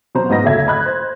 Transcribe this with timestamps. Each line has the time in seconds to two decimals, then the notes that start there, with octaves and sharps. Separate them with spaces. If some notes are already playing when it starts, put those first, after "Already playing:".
0.15 B2 F#3 C5 A#5
0.29 G#2 B3 D#5 A#6
0.44 F#1 D2 A3 E5 G#6
0.67 D#5 B5 F#6 G#6
0.86 C5